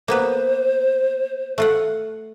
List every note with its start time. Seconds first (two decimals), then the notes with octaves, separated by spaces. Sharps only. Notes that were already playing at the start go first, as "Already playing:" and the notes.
0.08 A#3 B3 B4 C5
1.58 A3 F4 F#5